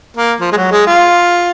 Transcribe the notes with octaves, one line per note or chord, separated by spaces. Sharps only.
A#3
F3
G#3
F#3
G#3
F4